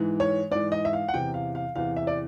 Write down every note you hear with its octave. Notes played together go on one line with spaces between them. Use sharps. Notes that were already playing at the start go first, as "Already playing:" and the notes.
Already playing: G#2 E3
C#5
G#2 E3 D5
D#5
E5
F5
F#5
E2 C3 E3 G5
F5
F5
E2 C3 E3 F5
E5
D5